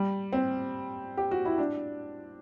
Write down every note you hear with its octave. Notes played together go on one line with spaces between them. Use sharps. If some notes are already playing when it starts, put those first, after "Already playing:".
Already playing: G3
C4
G4
F#4
E4
D4